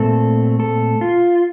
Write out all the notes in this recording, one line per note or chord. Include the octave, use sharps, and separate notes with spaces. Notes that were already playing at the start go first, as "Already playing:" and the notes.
Already playing: A#2 A3 C4 A4
A4
F4